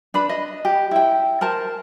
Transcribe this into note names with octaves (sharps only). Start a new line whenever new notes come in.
D4 B4 B5
D#5
G4
E4 G5
A#4 C5 A5